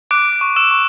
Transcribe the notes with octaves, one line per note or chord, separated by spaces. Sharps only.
D6 F#6 D7
C#6
E6 E7
C#6